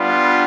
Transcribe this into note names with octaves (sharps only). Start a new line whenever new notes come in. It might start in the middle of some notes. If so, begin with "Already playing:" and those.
Already playing: G3 B3 D4 F4